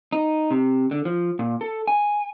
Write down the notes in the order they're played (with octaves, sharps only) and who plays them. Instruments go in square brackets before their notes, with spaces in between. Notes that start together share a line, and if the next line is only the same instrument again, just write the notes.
[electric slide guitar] D#4
C3
D3
F3
A#2
A4
G#5